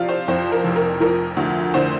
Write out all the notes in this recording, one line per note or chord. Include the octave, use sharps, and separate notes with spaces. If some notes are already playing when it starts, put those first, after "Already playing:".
Already playing: C3 F3 D5 F5
C5
F2 C5
A#4
F1
A#4
F3 A#4
D2
D3 C5